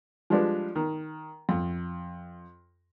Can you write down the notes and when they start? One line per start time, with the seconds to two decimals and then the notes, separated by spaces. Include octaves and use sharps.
0.30 F3 G3 G#3 D4 G4 B4
0.75 D#3
1.49 F2